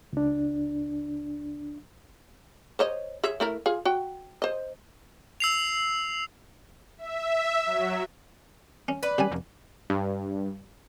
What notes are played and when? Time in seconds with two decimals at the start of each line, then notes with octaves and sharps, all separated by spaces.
0.13 C#2 D4
2.79 C5 C#5 D#5
3.23 G#4 C#5 E5
3.40 A3 E4 A#4
3.66 F4 G#4
3.85 F#4 G5
4.42 C5 D#5
5.40 E6 C7 F7
6.98 E5
7.65 F#3
8.88 C#4
9.03 B4 D5
9.18 C#3 G3 G#5
9.32 F1
9.90 G2